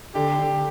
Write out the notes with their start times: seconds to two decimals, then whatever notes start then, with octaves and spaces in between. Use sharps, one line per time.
0.15 D3 G4
0.39 D3